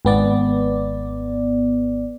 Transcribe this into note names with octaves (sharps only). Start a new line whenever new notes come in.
G#1 B3 D5